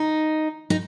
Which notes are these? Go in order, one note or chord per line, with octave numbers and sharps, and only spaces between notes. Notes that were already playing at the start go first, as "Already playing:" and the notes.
Already playing: D#4
D#4